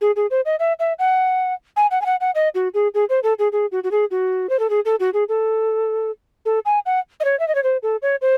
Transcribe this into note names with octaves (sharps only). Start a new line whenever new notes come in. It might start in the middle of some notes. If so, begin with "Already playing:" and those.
G#4
G#4
C5
D#5
E5
E5
F#5
G#5
F#5
G#5
F#5
F#5
D#5
F#4
G#4
G#4
C5
A4
G#4
G#4
F#4
F#4
G#4
F#4
C5
A4
G#4
A4
F#4
G#4
A4
A4
G#5
F#5
D#5
C#5
E5
D#5
C#5
C5
A4
C#5
C5